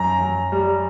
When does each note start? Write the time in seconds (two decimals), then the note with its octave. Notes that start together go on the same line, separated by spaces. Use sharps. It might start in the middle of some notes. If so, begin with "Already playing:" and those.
Already playing: F#2 A#5
0.21 F#2
0.52 G3